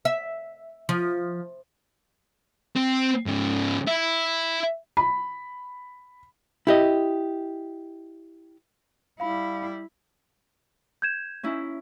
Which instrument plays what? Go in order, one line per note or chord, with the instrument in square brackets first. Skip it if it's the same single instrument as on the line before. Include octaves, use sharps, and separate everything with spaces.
[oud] E5
F3
[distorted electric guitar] C4
G#2 C#3
E4
[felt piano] B5
[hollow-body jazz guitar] E4 G4 D#5
[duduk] G3 [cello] E4 [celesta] F5 B5
[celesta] G6 G#6 E7
[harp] C#4 D#4 E4